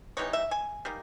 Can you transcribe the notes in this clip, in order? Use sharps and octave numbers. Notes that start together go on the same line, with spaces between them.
E3 G3 B3 D#4 C#5
E5
G#5
G3 A#3 D#4